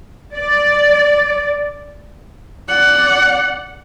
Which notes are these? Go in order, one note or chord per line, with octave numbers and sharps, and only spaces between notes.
D5
D5 F#5